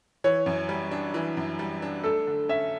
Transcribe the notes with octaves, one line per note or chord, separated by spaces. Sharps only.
E3 C#5
F#2
G3
D4
E3
F#2
G3
D4
A3 A4
D3
C#4 E5